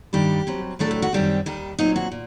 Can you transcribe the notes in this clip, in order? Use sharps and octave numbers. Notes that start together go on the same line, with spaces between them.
G2 D#3 G3 A#3 D4 G4
G2 F#3 C4
A2 F#3 A3 D4 A4
G4
F#4
F#2 D#3 G3 C4 G4
D#2 D#3 G3 G4
A#2 F#3 C4 D#4
F#4
A#2